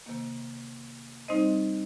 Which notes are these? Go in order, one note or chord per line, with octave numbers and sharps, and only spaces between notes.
C3 D#3 A#3
G3 C4 D#4 C5 D#5